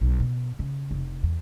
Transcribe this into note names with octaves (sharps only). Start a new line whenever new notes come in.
B1
B2
C#3
F1
E2